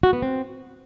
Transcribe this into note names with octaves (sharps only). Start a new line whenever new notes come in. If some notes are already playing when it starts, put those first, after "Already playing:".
F#4
B3
C4